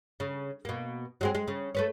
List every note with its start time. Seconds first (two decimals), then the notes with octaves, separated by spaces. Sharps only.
0.20 C#3
0.65 B2 A#3
1.21 F#3 G#3 C4
1.35 G#3
1.48 C#3
1.75 A3 B4 C#5